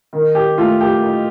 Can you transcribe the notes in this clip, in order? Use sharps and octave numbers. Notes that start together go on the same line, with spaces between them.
D#3
G4
A3 F4
G4
D#4